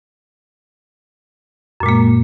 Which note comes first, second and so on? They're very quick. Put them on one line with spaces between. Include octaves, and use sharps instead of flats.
F#2 A#2 G#3 A#3